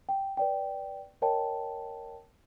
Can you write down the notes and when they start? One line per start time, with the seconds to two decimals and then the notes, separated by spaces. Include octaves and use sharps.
0.09 G5
0.37 B4 D5 G5
1.22 A#4 C#5 D#5 G5 A5